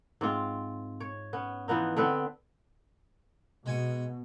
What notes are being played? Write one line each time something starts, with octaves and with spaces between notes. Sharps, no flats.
G#2 C4 F4
C#5
B3 C#4
E3 F3 B3 D#4
D3 B3 C4 B4
B2 G#3 G#5 C#6